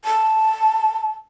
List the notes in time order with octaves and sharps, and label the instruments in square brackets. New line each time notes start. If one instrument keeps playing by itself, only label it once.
[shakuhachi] A5